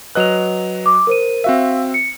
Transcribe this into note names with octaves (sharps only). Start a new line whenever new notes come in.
F#3 B4 D#5 F#6 F7
D6
A#4 C5 D#7
C4 F#4 E5 F5
C#7